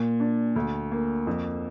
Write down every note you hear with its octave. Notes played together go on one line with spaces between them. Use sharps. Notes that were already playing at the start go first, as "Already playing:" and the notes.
Already playing: A#2
D4
D2
A#3
F2